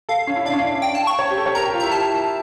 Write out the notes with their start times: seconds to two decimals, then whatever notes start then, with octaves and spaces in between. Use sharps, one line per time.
0.09 A4 F5
0.27 C#4
0.36 E4
0.45 D4 F5
0.54 C#4
0.62 D4
0.82 G5
0.95 A5
1.07 C#6
1.19 C#5
1.30 G4
1.38 A4
1.46 C#5
1.55 A#4 A#5
1.65 G4
1.74 F4
1.80 E4 A#5
1.92 A5